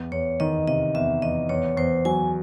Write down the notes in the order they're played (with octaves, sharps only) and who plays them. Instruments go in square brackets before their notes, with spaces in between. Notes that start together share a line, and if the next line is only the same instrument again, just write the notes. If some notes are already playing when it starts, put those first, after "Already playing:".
Already playing: [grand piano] E2
[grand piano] E2 [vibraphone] C#5
[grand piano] D#3 [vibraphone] D#5
[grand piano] C3 [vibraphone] D#5
[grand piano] E2 [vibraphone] E5
[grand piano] E2 [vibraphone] D#5
[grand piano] E2 [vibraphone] C#5
[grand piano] E2 [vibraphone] C5
[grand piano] F#3 [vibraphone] G#5